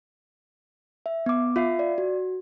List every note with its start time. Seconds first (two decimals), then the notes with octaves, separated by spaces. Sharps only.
1.06 E5
1.26 B3 D6
1.56 F4 E5 F5 C7
1.79 D5
1.98 F#4